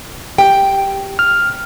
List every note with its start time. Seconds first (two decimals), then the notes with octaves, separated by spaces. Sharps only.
0.38 G4 G5
1.19 F6